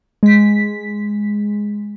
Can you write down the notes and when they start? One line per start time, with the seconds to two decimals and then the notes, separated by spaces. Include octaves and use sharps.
0.23 G#3 B6